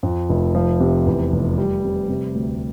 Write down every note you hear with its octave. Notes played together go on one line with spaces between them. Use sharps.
F2
F1
F3
C3
E2
F1
G3
C3
C3
D2